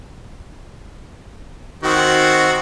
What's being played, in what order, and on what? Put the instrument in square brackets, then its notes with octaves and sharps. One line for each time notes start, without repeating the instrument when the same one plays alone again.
[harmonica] D#3 C4 F#4